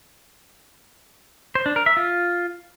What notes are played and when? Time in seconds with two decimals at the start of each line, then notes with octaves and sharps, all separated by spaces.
1.55 C5
1.66 D4
1.76 A#4
1.86 E5
1.97 F4